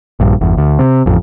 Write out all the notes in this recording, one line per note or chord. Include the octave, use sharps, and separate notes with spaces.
A#1 G2
G1 E2
D2
C3
A1 F2